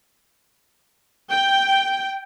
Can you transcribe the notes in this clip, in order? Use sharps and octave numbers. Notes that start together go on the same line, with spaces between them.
G5